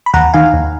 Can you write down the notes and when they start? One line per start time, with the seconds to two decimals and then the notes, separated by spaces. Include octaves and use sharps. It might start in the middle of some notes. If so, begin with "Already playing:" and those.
0.06 B5
0.14 D#2 F#5 A#5
0.33 D#3 F5 G#5
0.54 D#2